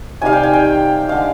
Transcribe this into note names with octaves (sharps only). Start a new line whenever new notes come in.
C3 D#3 G3 F5 G#5
G5
G#5
G5
D3 G#3 F5